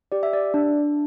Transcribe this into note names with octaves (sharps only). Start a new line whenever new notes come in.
G4 D5
E5
D5
D4